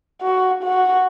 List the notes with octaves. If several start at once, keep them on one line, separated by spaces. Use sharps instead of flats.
F#4
F#4